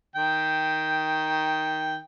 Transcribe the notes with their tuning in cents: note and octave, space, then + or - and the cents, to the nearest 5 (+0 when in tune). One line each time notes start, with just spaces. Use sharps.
D#3 +5 G5 +0